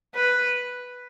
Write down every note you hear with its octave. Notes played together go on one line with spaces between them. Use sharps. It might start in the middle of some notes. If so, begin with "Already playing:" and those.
B4